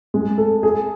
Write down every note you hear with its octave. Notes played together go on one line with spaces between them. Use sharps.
G#3
A4
G#4